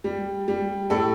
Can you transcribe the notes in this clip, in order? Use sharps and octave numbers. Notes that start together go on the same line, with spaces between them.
G3
G3
A2 A4